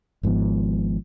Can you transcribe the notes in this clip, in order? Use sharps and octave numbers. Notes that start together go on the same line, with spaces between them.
G#1 G#2 F3 B3